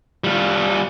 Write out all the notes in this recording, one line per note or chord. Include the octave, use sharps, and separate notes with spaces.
G3 F4